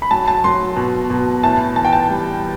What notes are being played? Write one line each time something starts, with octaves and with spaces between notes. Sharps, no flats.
B5
F#3 A5
A5
F#3 C6
B2
B2
A2 A5
E3 A5
G5
A5
G3